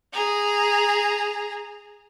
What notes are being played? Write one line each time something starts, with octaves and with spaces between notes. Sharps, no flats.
G#4 A#5